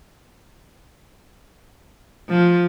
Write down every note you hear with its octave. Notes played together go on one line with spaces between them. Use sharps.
F3